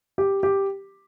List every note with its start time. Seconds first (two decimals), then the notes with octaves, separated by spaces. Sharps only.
0.18 G4
0.43 G4